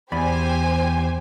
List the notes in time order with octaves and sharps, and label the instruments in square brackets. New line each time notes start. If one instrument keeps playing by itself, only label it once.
[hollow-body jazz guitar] E2 D5 B5 [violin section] G4 C5 G#5